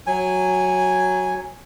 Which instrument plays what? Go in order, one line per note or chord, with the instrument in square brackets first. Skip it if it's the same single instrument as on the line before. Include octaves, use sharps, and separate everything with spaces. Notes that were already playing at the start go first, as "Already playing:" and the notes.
[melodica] F#3 G#5